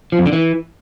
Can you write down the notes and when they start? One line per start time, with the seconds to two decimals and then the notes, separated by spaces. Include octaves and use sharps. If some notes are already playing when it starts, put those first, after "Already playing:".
0.12 F3
0.19 F2
0.26 D3
0.33 E3